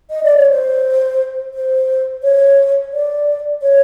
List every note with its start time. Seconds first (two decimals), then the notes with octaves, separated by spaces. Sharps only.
0.10 D#5
0.24 D5
0.37 C#5
0.50 C5
1.54 C5
2.23 C#5
2.93 D5
3.62 C#5